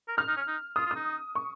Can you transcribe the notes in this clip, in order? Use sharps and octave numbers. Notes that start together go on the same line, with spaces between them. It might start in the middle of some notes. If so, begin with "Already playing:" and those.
A#4
D#4 F6
D#4
C#4
D#4
F4 D#6
F4
D#4 D#6
C#6